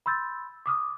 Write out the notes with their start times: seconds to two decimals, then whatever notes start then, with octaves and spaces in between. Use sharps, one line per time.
0.06 B5 C6 E6 G6 A6
0.66 D6 D#6 F6